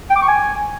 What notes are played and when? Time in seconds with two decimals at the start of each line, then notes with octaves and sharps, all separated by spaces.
0.10 G5
0.16 D6
0.22 C#6
0.28 G#5